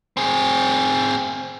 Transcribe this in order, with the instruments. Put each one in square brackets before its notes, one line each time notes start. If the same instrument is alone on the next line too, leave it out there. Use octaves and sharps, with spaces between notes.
[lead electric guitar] C4 G#4